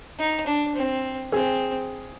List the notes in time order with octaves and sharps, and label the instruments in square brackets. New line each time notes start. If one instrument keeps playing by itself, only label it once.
[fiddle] D#4
D4
C4
[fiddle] C4 [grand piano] G#4